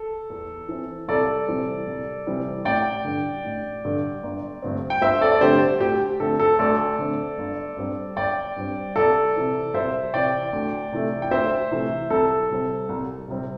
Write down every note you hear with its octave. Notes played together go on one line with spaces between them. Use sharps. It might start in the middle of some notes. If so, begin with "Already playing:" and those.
Already playing: A4
E2
E3 C4
C2 A4 D5
C3 E3 G3 C4
C2
C3 E3 G3 C4
A1 D5 G5
G2 D3
A1
G2 D3
G1
G2 D3 A3 C4
G5
G1 C5 E5
A4 D5
D5
G2 D3 A3 C4 G4 C5
D2 G4
D3 A3 C4 A4
A4
D2 A4 D5
D3 A3 C4
G1
G2 G3 C4
G1 D5 G5
G2 G3 C4
C2 A4 D5
C3 E3 C4
C2 C5 E5
C3 E3 C4 D5 G5
D2
C3 E3 A3
G5
D2 C5 E5
C3 E3 A3
C2 A4
C3 G3 C4
C2
C3 G3 C4